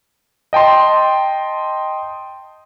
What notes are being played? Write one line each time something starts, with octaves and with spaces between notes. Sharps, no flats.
D#5 G5 A5 C6